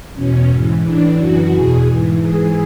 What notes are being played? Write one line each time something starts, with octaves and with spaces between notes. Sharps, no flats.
E2 B2 C#4
G#2 E3
A2 E3 D4
F#2 C#3 E3 F#4
E2 B2 G#4
G#2 E3
G#2 E3 G#4